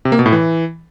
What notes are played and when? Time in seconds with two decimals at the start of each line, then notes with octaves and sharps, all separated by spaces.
0.05 C3
0.12 A#3
0.19 B2
0.26 A2
0.32 E3